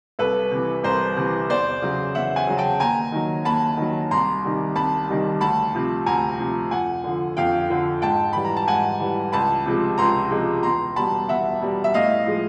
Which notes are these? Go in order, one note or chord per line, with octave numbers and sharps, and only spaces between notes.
C2 A4 B4
C3 E3
C2 A#4 C5
C3 E3
E2 C5 D5
C#3 F#3
E2 E5 F#5
F#5 G#5
C#3 F#3
G5 A5
D#2 G#5 A#5
D#3 F#3
D#2 A5 B5
D#3 F#3
C2 A#5 C6
C3 D#3 G3
C2 A5 B5
C3 D#3 G3
D2 A5 B5
C3 F3
D2 G#5 A#5
C3 F3
F2 F#5 G#5
D3 F3
F2 F5 G5
D3 F3
G#2 G5 A5
E3 G3 B5
A#5
A5
G#2 F#5 G#5
E3 G3
C#2 A5 B5
C3 F3 G#3
C#2 A#5 C6
C3 F3 G#3
E2 A#5 C6
B2 G3 A5 B5
E2 E5 F#5
B2 G3
E5
A2 D#5 F5
F3 G#3